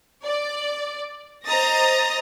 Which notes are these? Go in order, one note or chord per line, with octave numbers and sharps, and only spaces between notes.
D5
C5 D#5 A#5 D#6 A6 A#6